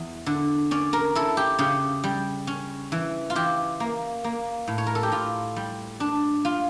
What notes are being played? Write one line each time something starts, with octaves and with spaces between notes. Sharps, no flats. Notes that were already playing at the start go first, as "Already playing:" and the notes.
Already playing: E2
D3
C#4 D5
A#4
E4 A4
G4
C#3 G4
G3
C#4
E3
F4
E3 G4
A#3
A#3
A2
C#5
A#4
A4
G4
A2 F4
G3
D4
F4